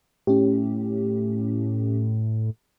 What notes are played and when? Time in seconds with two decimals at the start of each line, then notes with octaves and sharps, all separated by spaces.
0.27 A2 C#4 G4